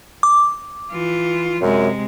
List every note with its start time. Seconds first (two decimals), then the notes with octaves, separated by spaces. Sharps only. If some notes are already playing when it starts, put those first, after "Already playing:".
0.23 D6
0.92 E3 F4
1.62 F#2 C3 G#3